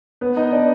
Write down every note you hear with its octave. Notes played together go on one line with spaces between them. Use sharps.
B3 B4
D#4 D#5
D4 D5